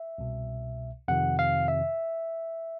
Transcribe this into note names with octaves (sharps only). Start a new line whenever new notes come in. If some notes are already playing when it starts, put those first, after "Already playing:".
Already playing: E5
C2 B2
F2 C3 D#3 F#5
F5
E5